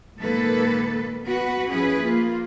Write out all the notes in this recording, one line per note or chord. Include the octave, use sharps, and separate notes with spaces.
A#2 D#3 G#3 A#3 A4 B4
B3 F#4 B4
F3 C#4 E4 G#4 B4
A#3 F4